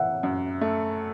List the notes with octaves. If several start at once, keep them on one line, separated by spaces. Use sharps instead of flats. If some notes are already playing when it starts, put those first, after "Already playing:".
Already playing: E3 E5 F#5
F#2
A3